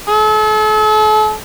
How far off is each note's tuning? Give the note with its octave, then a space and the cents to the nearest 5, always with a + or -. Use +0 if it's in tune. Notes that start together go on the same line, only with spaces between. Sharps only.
A4 -40